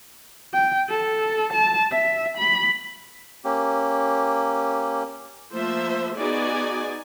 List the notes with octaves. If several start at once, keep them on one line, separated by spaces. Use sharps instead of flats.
G5
A4
A5
E5
B5
A#3 C#4 G4
F3 A3 A#3 C5 E5
B3 D#4 F#4 G#4 D5 G#5